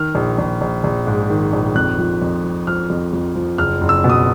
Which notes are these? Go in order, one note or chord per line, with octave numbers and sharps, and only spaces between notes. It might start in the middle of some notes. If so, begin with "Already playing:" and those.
Already playing: D#3 F6
A#1
A#1
A#1
A#1
G#2
D#3
A#1
F2 F#6
F3
F2
F3
F3 F6
F2
F2
F3
F#1 F6
F#1
E6
B2
D#6